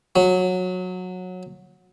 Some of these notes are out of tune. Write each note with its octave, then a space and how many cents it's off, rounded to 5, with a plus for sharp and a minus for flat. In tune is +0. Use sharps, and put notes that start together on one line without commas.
F#3 -15